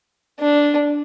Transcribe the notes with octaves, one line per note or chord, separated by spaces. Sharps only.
D4